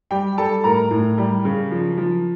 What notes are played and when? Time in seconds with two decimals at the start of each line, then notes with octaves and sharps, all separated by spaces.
0.11 G3 G4 G5
0.37 G3 A4 A5
0.64 A2 A#4 A#5
0.91 A2
1.18 G3
1.45 C#3
1.71 F3
1.98 F3